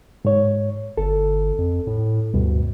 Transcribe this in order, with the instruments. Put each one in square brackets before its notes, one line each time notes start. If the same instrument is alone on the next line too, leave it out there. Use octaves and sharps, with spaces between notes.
[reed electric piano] G#2 C#5
[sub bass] G1 [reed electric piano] A4
[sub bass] F2
A2
[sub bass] D2 [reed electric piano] G2 B2